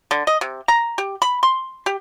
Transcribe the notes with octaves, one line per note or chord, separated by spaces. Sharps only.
D3
D#5
C3
A#5
G4
B5
C6
G4